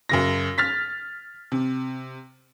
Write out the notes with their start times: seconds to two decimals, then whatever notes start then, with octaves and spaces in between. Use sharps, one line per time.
0.09 F#2 C#3 A#6
0.58 F6 A6 B6
1.52 C3